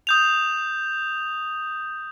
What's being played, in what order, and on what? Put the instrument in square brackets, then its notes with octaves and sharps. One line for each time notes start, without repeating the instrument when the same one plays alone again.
[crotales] D#6 G6 F7